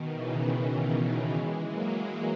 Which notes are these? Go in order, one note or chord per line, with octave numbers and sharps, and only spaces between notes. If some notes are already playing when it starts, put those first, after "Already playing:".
Already playing: B2 D#3
C#3 E3
E3 G#3
F#3 A#3
E3 G#3